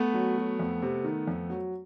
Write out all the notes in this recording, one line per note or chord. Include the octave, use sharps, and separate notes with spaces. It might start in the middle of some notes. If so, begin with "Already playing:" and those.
Already playing: A3 B3
F#3
F#3
F2
C3
D#3
F2
F#3